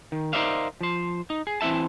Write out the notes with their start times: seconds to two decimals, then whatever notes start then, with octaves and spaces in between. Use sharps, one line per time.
0.12 D#3
0.33 D#4 A#4 C5 D5 E5 F5
0.81 F3 C5
1.30 D#4
1.47 G#4
1.61 E3 C4 E4 E5 A5